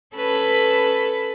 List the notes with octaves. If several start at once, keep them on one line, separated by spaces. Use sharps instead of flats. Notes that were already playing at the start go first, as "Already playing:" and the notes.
C#4 A4 B4